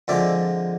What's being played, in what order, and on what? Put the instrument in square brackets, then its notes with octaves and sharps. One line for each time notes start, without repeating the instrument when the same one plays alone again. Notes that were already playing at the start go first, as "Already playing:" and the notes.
[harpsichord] F2 D3 F3 G#3 D5 E5